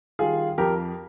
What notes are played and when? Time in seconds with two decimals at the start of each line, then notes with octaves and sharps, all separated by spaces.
0.19 D#3 G3 F4 G#4
0.58 F2 G4 A#4